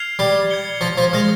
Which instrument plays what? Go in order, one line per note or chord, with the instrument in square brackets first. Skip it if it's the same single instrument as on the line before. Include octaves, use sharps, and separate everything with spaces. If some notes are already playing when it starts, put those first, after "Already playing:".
Already playing: [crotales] F6 G#6 C7 F7
[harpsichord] G3
[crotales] G#6 C#7 G7
[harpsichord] F3
F3
[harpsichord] G#3 [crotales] F6 A#6 F7